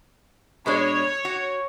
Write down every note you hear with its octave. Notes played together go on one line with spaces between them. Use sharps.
B2 G#3 D4 C#5
F#4